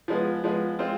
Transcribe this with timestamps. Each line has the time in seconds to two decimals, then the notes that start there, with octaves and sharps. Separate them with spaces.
0.08 F3 G#3 B3
0.44 F3 G#3 B3
0.79 G#3 C4 F4